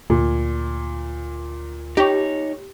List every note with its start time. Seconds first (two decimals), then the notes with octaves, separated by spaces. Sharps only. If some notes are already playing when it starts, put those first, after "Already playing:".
0.10 D2 A#2
1.97 D#4 G4 C#5